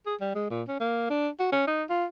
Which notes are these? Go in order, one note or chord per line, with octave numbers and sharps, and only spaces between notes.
G#4
G3
G#3
A#2
C#4
A#3
D4
F#4
C#4
D#4
F4